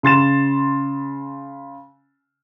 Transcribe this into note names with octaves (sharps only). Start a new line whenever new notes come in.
C#3 C6 A6 E7